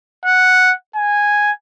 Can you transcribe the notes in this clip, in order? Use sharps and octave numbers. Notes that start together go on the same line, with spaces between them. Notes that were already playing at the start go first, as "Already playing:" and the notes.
F#5
G#5